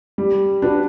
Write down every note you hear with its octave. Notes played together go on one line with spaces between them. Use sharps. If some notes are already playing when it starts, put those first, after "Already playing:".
G3
D4 F#4 B4